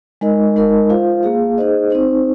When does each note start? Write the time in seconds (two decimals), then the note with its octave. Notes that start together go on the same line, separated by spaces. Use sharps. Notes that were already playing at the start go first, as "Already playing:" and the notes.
0.21 G#3 D#4 A#4 D#5
0.56 G#3 D#4 A#4 D#5
0.90 F4 C5 F5
1.23 A#3 G#4 F5
1.58 D#4 G#4 C5 D#5
1.90 C4 D#4 C5